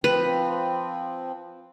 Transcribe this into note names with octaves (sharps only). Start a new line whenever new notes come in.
F3 C4 B4